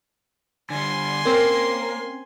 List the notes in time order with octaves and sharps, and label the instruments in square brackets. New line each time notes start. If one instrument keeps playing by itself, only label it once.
[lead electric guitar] D3 G3 [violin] G#5 C6
[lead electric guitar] A#3 [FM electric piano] C4 C#4 [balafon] A#4